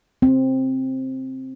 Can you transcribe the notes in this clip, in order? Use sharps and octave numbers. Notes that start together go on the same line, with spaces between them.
C4